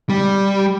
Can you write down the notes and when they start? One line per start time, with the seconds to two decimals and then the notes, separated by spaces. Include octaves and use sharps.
0.10 G3